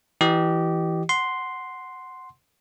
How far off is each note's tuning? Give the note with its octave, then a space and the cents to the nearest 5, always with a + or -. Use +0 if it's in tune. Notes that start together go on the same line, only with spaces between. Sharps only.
E3 +0 G4 -20 D#5 -30
F#5 +0 C6 +0